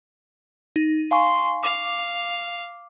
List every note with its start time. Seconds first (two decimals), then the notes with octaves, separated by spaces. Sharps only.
0.76 D#4
1.11 F5 G#5 C6 C#6
1.63 F5 D6